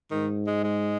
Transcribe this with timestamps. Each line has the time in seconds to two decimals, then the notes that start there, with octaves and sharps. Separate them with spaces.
0.11 G#2 D#3
0.47 G#3
0.64 G#3